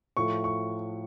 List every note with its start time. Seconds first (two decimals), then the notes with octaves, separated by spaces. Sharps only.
0.17 A2 F3 A3 C#6
0.44 C#6